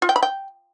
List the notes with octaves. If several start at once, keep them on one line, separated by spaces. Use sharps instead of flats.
F4
G5
B5
G5